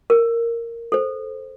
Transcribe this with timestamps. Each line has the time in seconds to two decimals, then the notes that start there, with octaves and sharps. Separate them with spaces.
0.10 A#4
0.92 A4 C5